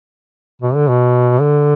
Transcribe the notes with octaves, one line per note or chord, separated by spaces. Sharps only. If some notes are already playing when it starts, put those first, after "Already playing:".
B2
D3
B2
D3